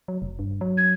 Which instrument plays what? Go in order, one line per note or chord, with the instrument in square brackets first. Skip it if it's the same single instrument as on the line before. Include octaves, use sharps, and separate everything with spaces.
[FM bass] F#3
F1
G2
F#3
[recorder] G#6